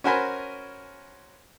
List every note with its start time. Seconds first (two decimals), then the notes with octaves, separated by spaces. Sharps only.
0.04 C#4 F#4 A#4 C5 G#5 B5